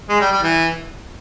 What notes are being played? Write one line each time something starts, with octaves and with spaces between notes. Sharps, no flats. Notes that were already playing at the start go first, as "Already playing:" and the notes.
G#3
G3
G3
E3